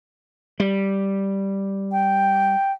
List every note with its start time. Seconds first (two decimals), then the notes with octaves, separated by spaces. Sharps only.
0.60 G3
1.92 G5